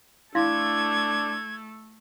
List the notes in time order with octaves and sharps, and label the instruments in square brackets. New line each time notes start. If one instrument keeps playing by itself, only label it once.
[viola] A3 A4 [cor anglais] D4 [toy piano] E4 F5 C6 [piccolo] G#6